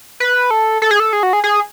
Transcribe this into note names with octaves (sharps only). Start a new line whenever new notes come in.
B4
A4
A4
G#4
A4
G#4
F#4
G#4
G#4